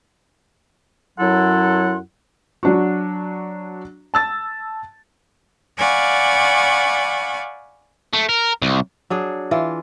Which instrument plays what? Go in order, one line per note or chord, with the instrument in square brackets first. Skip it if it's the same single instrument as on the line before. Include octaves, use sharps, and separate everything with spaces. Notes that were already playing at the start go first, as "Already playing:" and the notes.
[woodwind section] F#2 F#3 E4 A4 F#5 C6
[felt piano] F#3 D4 F#4
A5 E6 A6
[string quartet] D5 F5 F#5 G#5 B5 C#6
[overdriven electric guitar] A3
A#4
C2
[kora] F#3 D4 G#4
E3 F4